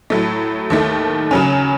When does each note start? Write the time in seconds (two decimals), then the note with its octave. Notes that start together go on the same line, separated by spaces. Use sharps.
0.10 A2 F#3 A3
0.70 D#2 D#3 A3
1.31 C#3 F#3 C#4